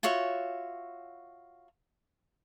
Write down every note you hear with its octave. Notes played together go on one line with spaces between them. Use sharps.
F4 F#4 C#5 E5